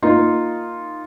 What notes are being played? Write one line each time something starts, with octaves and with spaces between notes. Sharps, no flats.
A#3 D#4 F4